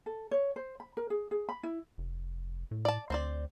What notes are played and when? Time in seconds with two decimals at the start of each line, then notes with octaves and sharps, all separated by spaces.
0.06 A4
0.31 C#5
0.56 C5
0.80 B5
0.97 A#4
1.10 G#4
1.31 G#4
1.49 B5
1.63 E4
1.98 F1
2.71 A2
2.85 D5 A5
3.10 D2 C4 C5 D5